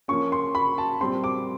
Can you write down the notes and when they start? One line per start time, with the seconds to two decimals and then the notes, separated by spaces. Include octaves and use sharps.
0.08 F3 A#3 C#4 C#6
0.32 C6
0.55 B5
0.78 A5
1.01 A#2 G3 C4 C6
1.24 D6